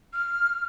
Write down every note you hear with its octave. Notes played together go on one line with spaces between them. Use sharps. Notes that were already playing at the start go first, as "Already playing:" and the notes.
F6